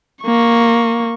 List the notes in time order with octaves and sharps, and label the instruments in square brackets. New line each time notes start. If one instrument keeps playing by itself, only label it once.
[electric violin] A#3 C#6